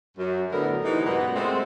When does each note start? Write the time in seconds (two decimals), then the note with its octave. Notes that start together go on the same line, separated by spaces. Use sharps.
0.17 F#2
0.52 D2 A2 D3 B3 A#4
0.85 C3 E3 D#4
1.04 F#2 A#2 G#3 B3
1.35 G#3 A3 C4